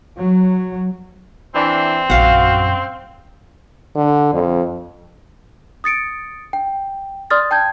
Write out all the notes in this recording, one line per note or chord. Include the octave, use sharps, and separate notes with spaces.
F#3
E3 C4 D4
A#1 F#2 F#4 F5 F#5
D3
F2
D#6 A6 C#7 D7
G5
D5 C6 D#6 F6 A6
G5 A5 G6 G#6